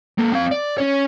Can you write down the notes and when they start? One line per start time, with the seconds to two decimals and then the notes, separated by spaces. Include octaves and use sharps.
0.19 A#3 A4
0.32 C4 F5
0.51 D5
0.78 C#4 C#5